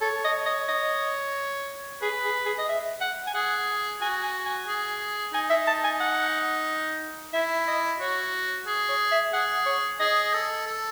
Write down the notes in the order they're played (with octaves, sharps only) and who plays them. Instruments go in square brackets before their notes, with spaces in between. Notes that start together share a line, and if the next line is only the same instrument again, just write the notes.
[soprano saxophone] A4 [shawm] C#5
[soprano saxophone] D#5
D#5
D#5
[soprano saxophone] G#4 [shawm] B4
[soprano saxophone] G#4
G#4
D#5
E5
F#5
G#5
[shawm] G#4 [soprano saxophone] F#5
[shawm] F#4 [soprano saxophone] G#5
[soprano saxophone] G#5
G#5
[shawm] G#4
[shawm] D#4 [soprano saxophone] G#5
[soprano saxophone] E5
A5
G#5
F#5
[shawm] E4 [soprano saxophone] E5
[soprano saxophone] D#5
[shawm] F#4 [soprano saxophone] C#5
[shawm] G#4
[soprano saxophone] C#5
E5
[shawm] G#4 [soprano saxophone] F#5
[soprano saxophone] C#5
[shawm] G#4 [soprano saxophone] D#5
[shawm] A4
A4